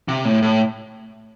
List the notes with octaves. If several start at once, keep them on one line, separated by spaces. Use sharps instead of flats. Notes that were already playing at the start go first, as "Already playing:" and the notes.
C3
A2
A2